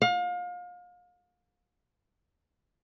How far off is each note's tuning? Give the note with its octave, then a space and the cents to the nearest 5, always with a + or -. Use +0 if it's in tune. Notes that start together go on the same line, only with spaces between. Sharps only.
F5 +35